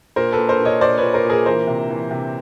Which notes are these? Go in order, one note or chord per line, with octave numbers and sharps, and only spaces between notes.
A#2 A#4 C5
A4 B4
A#2
A#4 C5
A#2
C#5 D#5
A#2 C5 D5
A#2 B4 C#5
A#4 C5
A#2 G#4 A#4
E3 A#4 C5
C3
E3
C3